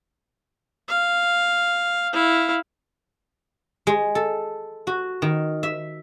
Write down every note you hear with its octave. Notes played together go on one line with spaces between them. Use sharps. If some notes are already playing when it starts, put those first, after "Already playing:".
F5
E4 F5
G#3
A4
F#4
D#3
E5